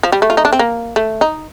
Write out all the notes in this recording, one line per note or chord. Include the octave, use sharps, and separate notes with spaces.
F3
G3
A3
F4
D#4
D4
C4
A#3
A3
D#4